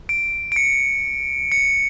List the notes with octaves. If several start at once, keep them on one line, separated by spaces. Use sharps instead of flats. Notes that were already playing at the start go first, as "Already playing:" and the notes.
D7
D7
C#7
C#7